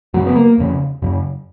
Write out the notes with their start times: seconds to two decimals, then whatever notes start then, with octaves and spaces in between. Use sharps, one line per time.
0.14 F#2 C#3 F#3
0.27 B3
0.36 A#3
0.58 F2 C#3
1.02 F#2 C#3